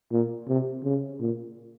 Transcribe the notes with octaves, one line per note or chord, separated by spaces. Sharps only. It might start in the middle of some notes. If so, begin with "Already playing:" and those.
A#2
C3
C#3
A#2